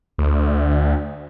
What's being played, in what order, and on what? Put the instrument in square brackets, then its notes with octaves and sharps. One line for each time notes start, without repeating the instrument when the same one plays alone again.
[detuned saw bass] D2